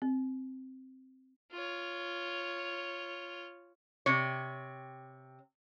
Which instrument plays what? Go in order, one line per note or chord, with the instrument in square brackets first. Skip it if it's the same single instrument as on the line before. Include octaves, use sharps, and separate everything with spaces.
[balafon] C4
[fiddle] F4 C#5
[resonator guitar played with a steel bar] C3 C#5